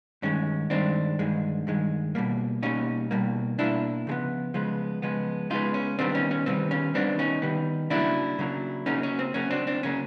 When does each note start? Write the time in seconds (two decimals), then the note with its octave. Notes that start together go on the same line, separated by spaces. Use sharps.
0.22 G2 D#3 G#3 C#4
0.70 G2 D#3 G#3 C4 D4
1.19 G2 D#3 G#3
1.67 G2 D#3 G#3
2.15 B2 G3 A#3
2.62 B2 G3 A#3 C#4 D#4
3.11 B2 G3 A#3
3.58 B2 G3 D4 E4
3.63 A#3
4.07 C#3 F3 G#3 B3
4.54 C#3 F3 G#3 B3
5.02 C#3 F3 G#3 B3
5.50 C#3 F3 G#3 B3 D#4 F4
5.74 C#4
5.99 C3 D#3 G3 B3 C4 D4
6.15 C#4 D#4
6.31 C#4
6.46 C3 D#3 G3 B3 C4
6.71 C#4
6.94 C3 D#3 G3 B3 C4 D4
7.19 C#4 D#4
7.42 C3 D#3 G3 B3
7.90 C#3 F#3 A#3 D4 E4
8.39 C#3 F#3 A#3
8.86 C#3 F#3 A#3 C#4 D#4
9.03 C#4
9.19 C4
9.34 C#3 F#3 A#3 C#4
9.51 C4 D4
9.67 C4 D4
9.83 C#3 F#3 A#3 C#4